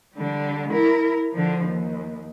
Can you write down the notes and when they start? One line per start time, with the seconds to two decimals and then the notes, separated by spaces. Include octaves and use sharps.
0.14 D3 G3
0.71 E4 A#4
1.33 D3 F3
1.65 D#2